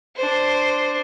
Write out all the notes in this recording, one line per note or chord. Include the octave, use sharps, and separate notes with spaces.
D4 C5